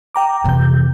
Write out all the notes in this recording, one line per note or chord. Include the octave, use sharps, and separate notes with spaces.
G5 A#5 D6
F2 C3 E3 G6